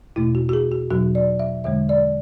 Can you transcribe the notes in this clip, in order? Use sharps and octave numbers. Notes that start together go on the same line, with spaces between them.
E2 B2 A3 E4
F#4
F#4
G#4
F#4
E2 B2 F#3 F#4
D5
E5
E2 D3 G#3 E5
D5